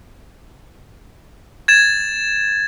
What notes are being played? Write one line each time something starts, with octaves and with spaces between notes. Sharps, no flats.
G#6 A6 E7